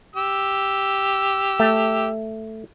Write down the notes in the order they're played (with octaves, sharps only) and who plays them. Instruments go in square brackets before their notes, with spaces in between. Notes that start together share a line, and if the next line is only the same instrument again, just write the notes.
[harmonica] G4 E6
[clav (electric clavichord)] A3